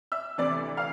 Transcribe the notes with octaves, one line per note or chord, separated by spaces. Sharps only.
E5 E6
D2 C3 E3 D5 D6
F5 F6